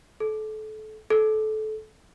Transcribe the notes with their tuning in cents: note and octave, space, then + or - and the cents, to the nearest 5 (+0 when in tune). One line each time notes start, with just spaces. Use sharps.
A4 -30
A4 -25